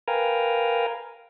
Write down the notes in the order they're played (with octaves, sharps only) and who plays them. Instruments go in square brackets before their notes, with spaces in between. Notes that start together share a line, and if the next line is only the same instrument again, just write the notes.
[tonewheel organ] A#4 B4 F5 G5 G#5 A#5